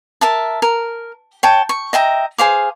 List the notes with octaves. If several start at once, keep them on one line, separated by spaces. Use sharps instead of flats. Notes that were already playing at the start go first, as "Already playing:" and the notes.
A#4 E5 A5
A#4
C#5 G5 A5
C#6
D#5 E5 G5 A#5
G#4 C5 F5 D6